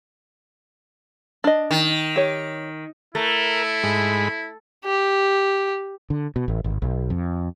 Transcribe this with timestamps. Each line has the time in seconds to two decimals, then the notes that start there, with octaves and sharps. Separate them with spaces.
1.44 D4 D#5
1.71 D#3
2.16 G4 C#5
3.15 A3 E4 A#4
3.83 G#2 G#3 B5
4.85 G4
6.10 D3
6.36 B2
6.48 A1
6.64 G#1
6.82 B1
7.10 F2